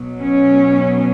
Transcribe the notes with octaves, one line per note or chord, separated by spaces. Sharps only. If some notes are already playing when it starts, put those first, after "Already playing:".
Already playing: B2 F#3 B3
C#4